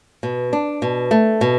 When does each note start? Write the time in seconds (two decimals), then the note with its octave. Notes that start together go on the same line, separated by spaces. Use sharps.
0.23 B2
0.53 D4
0.82 B2
1.11 A3
1.41 B2